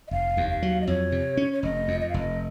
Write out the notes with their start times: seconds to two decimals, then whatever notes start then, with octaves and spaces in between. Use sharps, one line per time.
0.08 D#5
0.11 F1 F5
0.37 D#2
0.50 F5
0.63 F#3
0.81 D#5
0.87 F2 C#5
1.12 C3
1.37 C#4
1.53 C#5
1.63 F1 D#5
1.88 F2
2.01 D#5
2.09 F5
2.14 F1 D#5